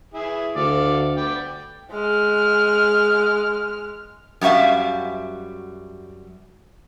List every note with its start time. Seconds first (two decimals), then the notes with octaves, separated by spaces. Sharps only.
0.14 E4 G#4 B4
0.56 D2 A4 D5 F5
1.17 B3 D5 G5
1.92 G#3 F6
4.41 F#2 G3 F#4 E5 F5